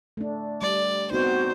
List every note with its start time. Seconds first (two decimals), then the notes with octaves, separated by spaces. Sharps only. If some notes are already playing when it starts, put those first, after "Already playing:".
0.17 A3 D4
0.62 G3 D5
1.11 B3 C4 D#4 F#4 C5 G6